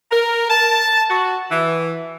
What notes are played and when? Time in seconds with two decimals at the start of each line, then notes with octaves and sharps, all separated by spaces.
0.12 A#4
0.50 A5
1.09 F#4
1.51 E3